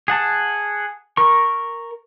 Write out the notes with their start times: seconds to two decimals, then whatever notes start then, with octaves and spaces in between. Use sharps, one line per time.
0.08 G#4 F#5 A5
1.17 A#4 C#6